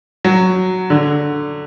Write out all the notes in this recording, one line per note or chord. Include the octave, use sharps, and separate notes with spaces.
F#3
D3